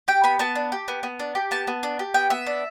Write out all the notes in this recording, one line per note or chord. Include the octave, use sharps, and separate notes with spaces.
G4 G5
B3 B5
B3 A5
D4
G4
B3
B3
D4
G4
B3 A5
B3
D4
G4
B3 G5
B3 E5
D4